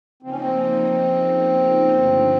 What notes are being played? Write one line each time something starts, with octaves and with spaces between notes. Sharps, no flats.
C#3 F3 A#3 C4 D#4
C#4
C4
G2 D3 F3 A3